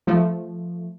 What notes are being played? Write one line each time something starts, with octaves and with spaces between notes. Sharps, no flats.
F3 A3